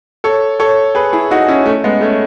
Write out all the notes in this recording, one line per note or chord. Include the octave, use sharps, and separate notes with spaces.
A4 C#5
A4 C#5
G#4 B4
E4 G#4
D#4 F#4
C#4 E4
A3 C#4
G#3 B3
A3 C#4